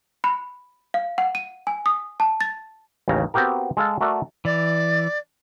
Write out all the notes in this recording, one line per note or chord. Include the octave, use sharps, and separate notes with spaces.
B5
F5
F#5
D#7
G#5
D#6
A5
A6
A1 D#2 C#3 A#5
B3 C4 F#4 G4 A#4
G#3 A4 F5 A5
A3 F#4 A#4 D5
E3 D5